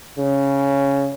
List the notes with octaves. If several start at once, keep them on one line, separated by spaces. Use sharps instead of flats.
C#3